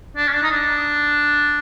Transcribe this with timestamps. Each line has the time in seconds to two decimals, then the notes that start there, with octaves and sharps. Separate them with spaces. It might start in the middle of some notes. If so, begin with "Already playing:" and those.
0.17 D4
0.28 C#4
0.33 D4
0.43 D#4
0.51 D4